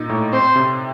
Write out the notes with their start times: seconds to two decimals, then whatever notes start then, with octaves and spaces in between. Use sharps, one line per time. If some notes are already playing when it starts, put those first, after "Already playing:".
Already playing: A#2 D#4
0.10 A2
0.33 C4 C5
0.56 C3